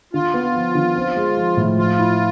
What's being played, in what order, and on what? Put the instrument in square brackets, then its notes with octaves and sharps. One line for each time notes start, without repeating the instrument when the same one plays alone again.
[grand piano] D3 [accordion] F4
[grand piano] B3
F3
D3
C4
G#3
F3
A2
[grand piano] F3 [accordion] F4
[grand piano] E4